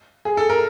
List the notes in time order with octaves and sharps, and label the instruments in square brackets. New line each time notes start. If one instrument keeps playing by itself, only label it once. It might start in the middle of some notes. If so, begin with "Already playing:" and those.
[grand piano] G#4
A4
A#4